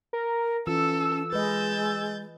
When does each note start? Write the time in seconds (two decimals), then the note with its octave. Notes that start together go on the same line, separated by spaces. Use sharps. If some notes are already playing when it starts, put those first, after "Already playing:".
0.13 A#4
0.67 E3 C#4 F4 A4 E6
1.33 G#3 B4 D#5 G6 A6